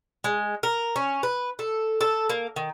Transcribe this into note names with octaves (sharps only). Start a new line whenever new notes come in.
G#3
A#4
C#4
B4
A4
A4
A#3
D#3